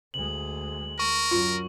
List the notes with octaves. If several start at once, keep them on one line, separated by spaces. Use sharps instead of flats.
D2 G#3 F#7
A#4 C#6
F#2 F4